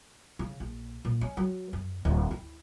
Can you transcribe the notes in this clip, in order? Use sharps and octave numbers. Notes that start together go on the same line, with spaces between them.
C#3
A#1
A#2
C#4
F#3
F#2
D1
E4